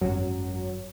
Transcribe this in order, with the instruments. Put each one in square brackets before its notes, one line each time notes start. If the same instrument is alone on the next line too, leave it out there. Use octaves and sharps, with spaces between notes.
[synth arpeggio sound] G#1 F#2 F#3